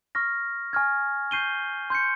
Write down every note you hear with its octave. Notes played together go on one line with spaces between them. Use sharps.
C#6 F6 A#6
G#5 C#6 F6 G#6
C#6 G6 C7 D#7 G7
C6 G6 C#7